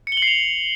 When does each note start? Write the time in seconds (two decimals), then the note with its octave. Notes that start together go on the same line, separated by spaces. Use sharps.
0.07 C#7
0.12 G7
0.17 F#7
0.22 C7
0.27 F7